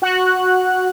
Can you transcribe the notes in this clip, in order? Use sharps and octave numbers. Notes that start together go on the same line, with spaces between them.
F#4 F#6